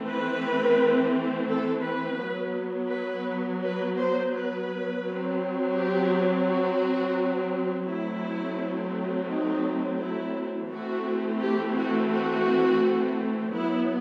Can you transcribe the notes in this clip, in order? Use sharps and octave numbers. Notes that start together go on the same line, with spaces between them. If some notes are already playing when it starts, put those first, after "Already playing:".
Already playing: E3 A3 C4
B4
A4
B4
F#3 B3
B4
B4
C5
B4
F#3 C4
G4
F#4
F#3 A3 C4 E4
D#4
E4
E3 A3 C4 F#4
G4
F#4
F#4
F#3 B3 E4